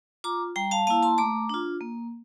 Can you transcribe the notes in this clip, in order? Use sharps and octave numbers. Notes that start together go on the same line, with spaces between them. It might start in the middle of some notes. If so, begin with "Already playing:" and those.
F4 A#5 D6
G3 G5 A#5
F5 A5
A#3 E4 F5 A5
A5 C6
A3 A#5 D6
D4 F4
A#3